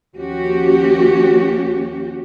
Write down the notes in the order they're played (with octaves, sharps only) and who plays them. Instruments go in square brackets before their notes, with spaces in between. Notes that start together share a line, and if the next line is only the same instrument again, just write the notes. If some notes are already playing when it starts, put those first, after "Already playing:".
[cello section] D#2 F3 C#4 F#4 G4